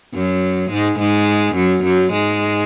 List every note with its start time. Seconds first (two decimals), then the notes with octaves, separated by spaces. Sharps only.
0.14 F#2 F#3
0.71 G#2 G#3
0.99 G#2 G#3
1.55 F#2 F#3
1.84 F#2 F#3
2.12 G#2 G#3